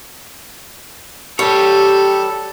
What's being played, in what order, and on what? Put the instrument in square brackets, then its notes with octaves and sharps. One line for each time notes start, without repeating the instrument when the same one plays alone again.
[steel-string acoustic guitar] G3 [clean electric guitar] G4 C#5 [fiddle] A4